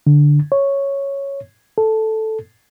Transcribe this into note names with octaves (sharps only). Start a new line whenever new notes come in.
D3
C#5
A4